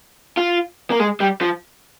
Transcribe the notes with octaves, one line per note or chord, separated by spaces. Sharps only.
F4
A#3
G#3
G3
F3